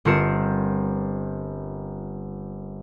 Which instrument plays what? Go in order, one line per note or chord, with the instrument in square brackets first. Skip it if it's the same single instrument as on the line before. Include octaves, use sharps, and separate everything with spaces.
[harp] G1 C4 F4 A#4 C#7 E7